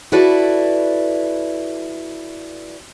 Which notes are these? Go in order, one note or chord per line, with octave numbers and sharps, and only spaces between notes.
E4 F#4 A4 B4 D5